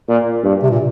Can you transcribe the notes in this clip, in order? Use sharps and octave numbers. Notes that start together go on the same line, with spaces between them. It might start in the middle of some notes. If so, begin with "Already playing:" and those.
A#2
G2
C3
A#2